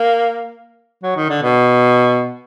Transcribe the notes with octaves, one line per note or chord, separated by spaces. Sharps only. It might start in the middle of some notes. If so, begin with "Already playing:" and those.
Already playing: A#3
F#3
D#3
D3
B2